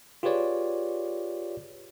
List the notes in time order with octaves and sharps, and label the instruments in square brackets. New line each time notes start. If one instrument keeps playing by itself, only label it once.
[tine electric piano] F4 G4 G#4 B4 C#5 D5